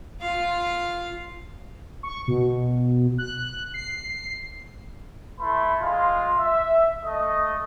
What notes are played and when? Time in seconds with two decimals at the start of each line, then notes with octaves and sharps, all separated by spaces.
0.20 F4 F5
2.03 C#6
2.28 B2
3.18 F#6
3.74 C7
5.40 A3 E4 B4 B5 C6
5.80 G#3 F4
6.39 E5
7.05 A3 D#5